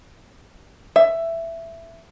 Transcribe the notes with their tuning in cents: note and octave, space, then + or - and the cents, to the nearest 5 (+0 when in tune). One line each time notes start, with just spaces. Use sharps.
E5 +10